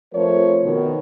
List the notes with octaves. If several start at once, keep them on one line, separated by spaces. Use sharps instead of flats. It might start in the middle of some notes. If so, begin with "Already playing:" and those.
F2 F3 A3 A#4 C5 C#5
B2 D#3